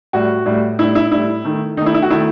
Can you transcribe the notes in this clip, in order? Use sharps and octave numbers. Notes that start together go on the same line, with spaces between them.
A2 G3 F#4
A2 G3
A2 G3 E4
E4
A2 G3 E4
D#3 A3
D#3 A3 D#4 E4
E4
F#4
D#3 A3 E4